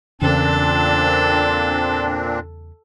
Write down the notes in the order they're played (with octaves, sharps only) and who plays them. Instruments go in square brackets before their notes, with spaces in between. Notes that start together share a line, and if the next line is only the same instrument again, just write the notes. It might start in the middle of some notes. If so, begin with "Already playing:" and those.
[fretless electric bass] E2 C#3 [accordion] A#2 C4 D4 [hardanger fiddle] A4